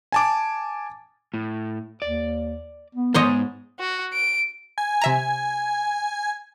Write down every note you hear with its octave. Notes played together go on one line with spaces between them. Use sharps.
G#5 A5 D6
A2
D#2 D5
B3
G#2 B3 C5 C#5 D#5 G#5
F#4
D7
G#5
C3 E5 A#5